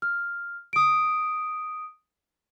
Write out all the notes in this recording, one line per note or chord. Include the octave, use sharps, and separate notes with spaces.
F6
D#6 D7